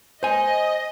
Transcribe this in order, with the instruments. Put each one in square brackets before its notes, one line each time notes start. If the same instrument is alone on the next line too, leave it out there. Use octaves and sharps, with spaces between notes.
[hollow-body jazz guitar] C5 G#5 [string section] D#5